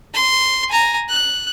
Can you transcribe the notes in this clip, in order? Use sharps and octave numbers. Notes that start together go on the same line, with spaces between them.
C6
G#5 A#5
F#6